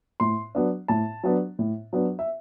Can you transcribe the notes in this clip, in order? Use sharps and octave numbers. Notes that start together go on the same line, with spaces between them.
A2 C6
F#3 B3 D4
A2 A5
F#3 B3 D4
A2
F#3 B3 D4
E5